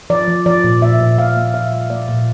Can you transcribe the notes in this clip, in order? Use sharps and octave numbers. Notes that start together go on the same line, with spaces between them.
F3 D5
F3
F3 D5
A#2
A#2 E5
A#2
A#2 F5
A#3
A#2 E5
G3
A#3 D5
A#2